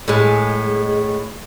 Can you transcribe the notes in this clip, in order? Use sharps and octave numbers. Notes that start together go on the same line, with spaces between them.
A2 G#3